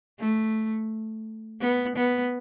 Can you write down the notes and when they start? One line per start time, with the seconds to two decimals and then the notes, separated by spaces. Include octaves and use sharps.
0.20 A3
1.61 B3
1.96 B3